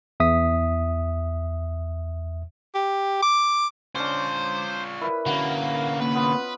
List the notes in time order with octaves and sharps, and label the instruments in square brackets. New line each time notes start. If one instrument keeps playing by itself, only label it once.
[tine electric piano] E2 E5 D#6 B6
[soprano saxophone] G4
D6
[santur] C#4 D4 [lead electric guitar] F4 C#5 [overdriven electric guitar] C5 [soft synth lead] D6
[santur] E4 B4 [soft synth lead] A#4
[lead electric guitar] D3 C#4 [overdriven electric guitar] A#3 [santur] F#4
[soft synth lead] A#3 [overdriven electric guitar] B4
[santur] B3 F4